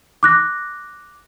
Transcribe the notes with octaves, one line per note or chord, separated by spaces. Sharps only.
D6 F#6 A#6